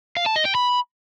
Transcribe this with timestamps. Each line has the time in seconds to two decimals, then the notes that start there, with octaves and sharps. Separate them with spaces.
0.17 F5
0.26 A5
0.36 D#5
0.45 G5
0.55 B5